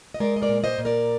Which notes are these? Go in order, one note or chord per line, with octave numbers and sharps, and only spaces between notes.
D#5
G#3 A#4 D5
D#5
A#4 D5
A#2
C5 D#5
A#2
A#4 D5